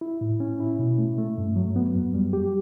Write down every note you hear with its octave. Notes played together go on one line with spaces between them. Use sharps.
E4
A2
C#4
E4
B2
A3
A3
G2
F#3
B3
F#2
G3
G4